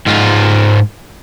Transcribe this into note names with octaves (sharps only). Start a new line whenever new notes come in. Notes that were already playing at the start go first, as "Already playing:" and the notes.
G#2 F4